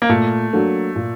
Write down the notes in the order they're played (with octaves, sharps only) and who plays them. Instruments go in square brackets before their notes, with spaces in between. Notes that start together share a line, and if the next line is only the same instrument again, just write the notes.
[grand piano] A#3
[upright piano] A#2 [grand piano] A3
[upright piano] F#3 A#3 D4 A4
A#2